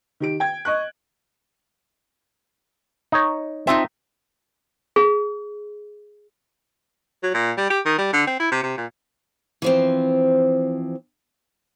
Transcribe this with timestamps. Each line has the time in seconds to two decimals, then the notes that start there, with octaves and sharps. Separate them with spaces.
0.20 D#3 G4 D7
0.40 G5 G#6
0.65 D#5 C#6 F#6
3.12 D#4 C#5
3.67 C4 D#4 F4 E5
4.96 G#4
7.23 F#3
7.34 A#2
7.58 G3
7.70 G4
7.86 D#3
7.98 G3
8.13 D3
8.27 C4
8.40 E4
8.52 C3
8.63 C3
8.77 A#2
9.62 E3 F3 C4